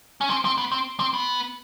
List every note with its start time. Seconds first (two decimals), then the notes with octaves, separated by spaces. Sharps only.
0.21 C#4
0.30 C4
0.45 C4
0.58 B3
0.72 C4
0.99 C4
1.14 B3